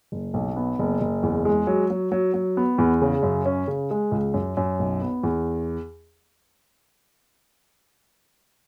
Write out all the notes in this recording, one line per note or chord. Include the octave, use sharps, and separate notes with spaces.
F#1
B1
B3
F#1
F#1
E2
G#3
F#3
F#3
F#3
F#3
B3
E2
C#3
F#2
C#4
C#3
G#3
C#2
F#2
F#2
B1
B3
E2